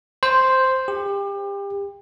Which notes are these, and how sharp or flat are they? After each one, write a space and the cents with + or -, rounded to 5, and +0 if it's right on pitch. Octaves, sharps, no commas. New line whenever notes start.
C5 +0
G4 +30